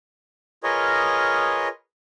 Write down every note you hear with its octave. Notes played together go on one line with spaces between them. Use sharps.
F4 G#4 A#4 B4 C#5 D#5